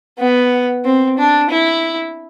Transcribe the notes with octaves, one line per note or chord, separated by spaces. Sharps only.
B3
C4
D4
E4